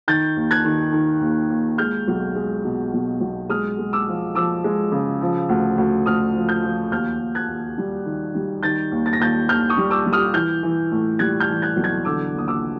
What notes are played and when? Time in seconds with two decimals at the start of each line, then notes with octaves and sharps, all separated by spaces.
0.08 D#3 G6 A6
0.36 D#2
0.51 F#6 G#6
0.65 D#3
0.92 D#3
1.21 D#2
1.50 D#2
1.78 G#3 F6 G6
2.08 B1
2.35 G#3
2.65 B2
2.93 B1
3.21 B1
3.49 G#3 D#6 F6
3.79 G#3
3.93 D6 E6
4.07 F3
4.35 F3 D6 E6
4.64 G#3
4.92 C#3
5.21 F3
5.49 D2
5.78 D2
6.06 D2 D#6 F6
6.34 F3
6.49 F6 G6
6.63 F3
6.91 D#2 F6 G6
7.20 D#2
7.35 F#6 G#6
7.49 D#2
7.78 G3
8.05 D#3
8.35 G3
8.63 D#3 G6 A6
8.92 D#2
9.06 A6
9.13 A#6
9.20 D#2 G6 A6
9.48 D#2 F6 G6
9.70 C#6 D#6
9.78 G3
9.91 D6 E6
10.06 G3
10.13 D#6 F6
10.34 E3 F6 G6
10.63 E3
10.92 A2
11.19 G3 F#6 G#6
11.40 F6 G6
11.49 E3
11.62 F#6 G#6
11.76 B1
11.84 F#6 G#6
12.05 D3 D6 E6
12.34 D#2 D#6
12.48 D6 E6